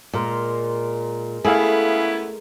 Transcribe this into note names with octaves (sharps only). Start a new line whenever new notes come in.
A#2 G#3 A#4 C5
A3 B3 C#4 E4 G#4 F5